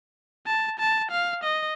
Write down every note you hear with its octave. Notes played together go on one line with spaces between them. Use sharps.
A5
A5
F5
D#5